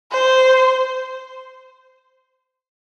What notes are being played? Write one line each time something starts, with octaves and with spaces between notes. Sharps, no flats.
C5